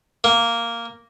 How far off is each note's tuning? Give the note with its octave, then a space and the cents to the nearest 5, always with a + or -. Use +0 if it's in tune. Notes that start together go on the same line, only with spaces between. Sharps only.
A#3 -5